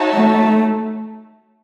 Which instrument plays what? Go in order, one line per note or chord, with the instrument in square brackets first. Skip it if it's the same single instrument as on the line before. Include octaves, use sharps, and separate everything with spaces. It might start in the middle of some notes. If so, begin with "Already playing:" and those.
Already playing: [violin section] D#4 F#4 C#5 E5 A5
[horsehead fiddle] A3